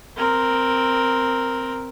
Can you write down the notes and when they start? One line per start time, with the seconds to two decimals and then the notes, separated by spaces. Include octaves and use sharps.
0.16 C4 A#4